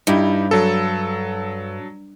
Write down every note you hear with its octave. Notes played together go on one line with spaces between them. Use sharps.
G2 D#4 E4 G4
F#3 A4